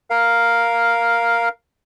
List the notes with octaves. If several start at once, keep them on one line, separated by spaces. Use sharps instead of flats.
A#4 F5